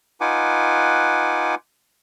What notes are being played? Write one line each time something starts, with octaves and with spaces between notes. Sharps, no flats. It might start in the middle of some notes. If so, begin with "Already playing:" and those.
D#4 F4 B4 F#5 G#5 D6